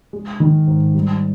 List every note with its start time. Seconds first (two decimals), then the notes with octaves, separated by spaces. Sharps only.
0.13 G#3
0.40 D#3
0.67 G#2
0.95 G3